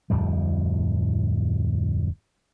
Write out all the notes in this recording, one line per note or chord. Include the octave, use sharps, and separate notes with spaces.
D1 F2 A2 G3